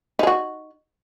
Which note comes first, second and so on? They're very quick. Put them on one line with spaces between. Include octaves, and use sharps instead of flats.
D#4 G#4 F#4